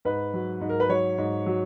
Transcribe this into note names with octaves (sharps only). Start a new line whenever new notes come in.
G#2 B4
F#3
G#2
A#4
B4
F#3 C#5
G#2
F#3